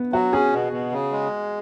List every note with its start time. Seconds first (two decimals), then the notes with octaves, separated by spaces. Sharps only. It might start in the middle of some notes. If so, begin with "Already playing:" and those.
Already playing: B3
0.13 F#3 F#4
0.33 C#4 G#4
0.53 B2
0.73 B2
0.92 C#3
1.12 G#3